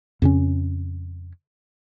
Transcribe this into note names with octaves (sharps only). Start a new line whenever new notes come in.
F2 C#3 C#4